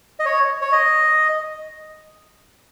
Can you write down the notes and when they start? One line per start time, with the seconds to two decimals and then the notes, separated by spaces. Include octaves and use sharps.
0.19 D#5
0.25 C#5
0.62 C#5
0.72 D#5